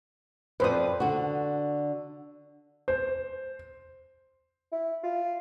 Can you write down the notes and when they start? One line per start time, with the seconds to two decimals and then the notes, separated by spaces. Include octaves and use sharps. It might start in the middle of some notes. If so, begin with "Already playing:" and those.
0.60 F2 B4 C5 D5 D#6
1.00 D3 F#4
2.88 C5
4.72 E4
5.04 F4